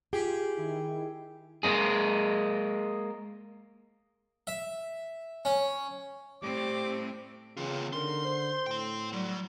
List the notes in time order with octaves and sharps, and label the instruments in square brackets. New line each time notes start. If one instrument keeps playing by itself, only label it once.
[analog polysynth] F4 [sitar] G4 [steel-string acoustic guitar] G#4
[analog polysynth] D#3 E4
[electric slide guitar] G#3 A#3 C4 D#4 G#4
[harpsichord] E5
C#4
[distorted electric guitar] A2 [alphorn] G3 [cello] C4 [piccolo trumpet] D6
[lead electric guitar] E2 F4 [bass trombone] C#3 [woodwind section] E3 C4
[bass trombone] D3 [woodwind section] D#4 A#4 [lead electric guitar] C6
[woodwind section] C5
[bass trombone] A2 [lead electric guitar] G5 C6
[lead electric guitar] F#3 [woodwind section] G3